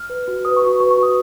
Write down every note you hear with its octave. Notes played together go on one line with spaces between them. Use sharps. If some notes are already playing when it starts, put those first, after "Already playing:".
Already playing: F6
B4
F#4
B4 D#6
C#6
F#4
C#6
B4 C#6
C#6
F#4
D#6